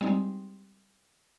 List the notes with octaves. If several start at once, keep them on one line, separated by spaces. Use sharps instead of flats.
G3 G#3 C4 D#4